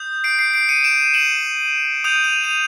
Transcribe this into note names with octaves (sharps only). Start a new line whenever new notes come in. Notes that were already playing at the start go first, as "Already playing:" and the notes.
Already playing: D#6 G6
C7 D7
C7 D7
C7 D7
C#7 D#7
D7 E7
E7 F#7
D#6 G6 D#7 F7
D#7 F7
D#7 F7